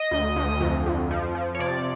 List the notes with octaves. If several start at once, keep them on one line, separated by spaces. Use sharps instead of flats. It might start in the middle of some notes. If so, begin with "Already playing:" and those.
Already playing: D#5
D2
D2
F2
F2
F3
F3
C#5
C3 D5